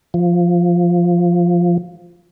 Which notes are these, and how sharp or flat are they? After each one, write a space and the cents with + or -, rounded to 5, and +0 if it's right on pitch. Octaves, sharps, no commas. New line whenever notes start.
F3 +0